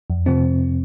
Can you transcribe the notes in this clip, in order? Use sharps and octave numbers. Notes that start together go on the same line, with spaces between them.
F2
C3 F3 C4